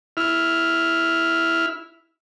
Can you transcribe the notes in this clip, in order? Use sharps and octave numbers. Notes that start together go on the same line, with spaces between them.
E4 F6